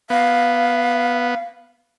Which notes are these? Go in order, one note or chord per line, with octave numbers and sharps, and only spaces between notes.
B3 F5